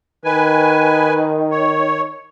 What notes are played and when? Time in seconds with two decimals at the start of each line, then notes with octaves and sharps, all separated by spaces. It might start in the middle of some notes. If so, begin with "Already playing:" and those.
0.25 D#3 B4 G#5
1.51 C#5